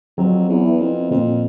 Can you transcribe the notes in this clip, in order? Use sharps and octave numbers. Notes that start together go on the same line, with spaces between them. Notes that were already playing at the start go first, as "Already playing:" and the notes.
F2 F#3
E2
B3 E4
F2
F2 A#2